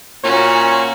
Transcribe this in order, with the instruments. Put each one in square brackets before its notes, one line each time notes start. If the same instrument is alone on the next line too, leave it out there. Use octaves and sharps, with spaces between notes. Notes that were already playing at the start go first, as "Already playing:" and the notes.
[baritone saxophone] A#2 [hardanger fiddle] C#4 F#4 [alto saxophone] C#5